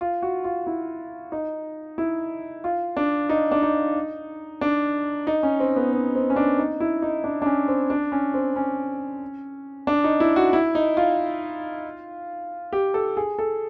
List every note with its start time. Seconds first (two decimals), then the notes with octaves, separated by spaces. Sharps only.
0.01 F4
0.22 F#4
0.44 F4
0.67 E4
1.32 D#4
1.98 E4
2.64 F4
2.97 D4
3.29 D#4
3.51 D4
3.63 D#4
4.61 D4
5.27 D#4
5.43 C#4
5.60 C4
5.76 B3
5.93 C4
6.15 C4
6.30 C#4
6.36 D4
6.58 D#4
6.80 E4
7.02 D#4
7.24 D4
7.42 D4
7.46 C#4
7.68 C4
7.90 D4
8.12 C#4
8.34 C4
8.56 C#4
9.87 D4
10.04 D#4
10.20 E4
10.36 F#4
10.53 E4
10.75 D#4
10.97 F4
12.73 G4
12.94 A4
13.17 G#4
13.39 A4